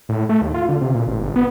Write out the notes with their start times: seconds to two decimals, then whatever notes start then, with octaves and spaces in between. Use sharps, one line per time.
0.09 A2
0.29 A3
0.42 D#2
0.54 F4
0.69 D3
0.81 C3
0.95 A#2
1.07 A1
1.21 G1
1.36 B3